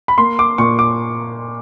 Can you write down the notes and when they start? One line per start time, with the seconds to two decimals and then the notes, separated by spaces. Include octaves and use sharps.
0.08 B5
0.18 A#3 C6
0.39 D6
0.58 A#2 C#6
0.79 D6